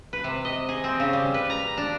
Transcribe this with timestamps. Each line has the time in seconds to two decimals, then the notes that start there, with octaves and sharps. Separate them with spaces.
0.13 B4
0.24 C3
0.45 D#5
0.69 G#4
0.84 C4
1.00 C#3
1.13 G3
1.34 B4
1.50 A#5
1.77 D4